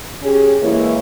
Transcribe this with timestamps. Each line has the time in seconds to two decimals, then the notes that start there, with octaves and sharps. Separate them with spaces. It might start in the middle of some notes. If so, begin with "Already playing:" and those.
0.23 C#4 G4 G#4
0.61 E3 G#3 A#3 E4 C#5